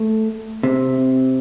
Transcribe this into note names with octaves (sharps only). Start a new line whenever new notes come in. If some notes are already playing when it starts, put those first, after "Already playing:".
Already playing: A3
C3